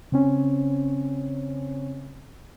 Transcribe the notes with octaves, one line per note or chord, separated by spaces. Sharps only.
C#3 C4 C#4